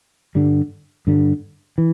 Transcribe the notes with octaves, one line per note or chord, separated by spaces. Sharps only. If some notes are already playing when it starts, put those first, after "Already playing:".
G2 D3 G3
G2 D3 G3
E3